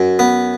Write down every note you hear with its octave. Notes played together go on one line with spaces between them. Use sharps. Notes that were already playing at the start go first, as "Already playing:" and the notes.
Already playing: F#2
B3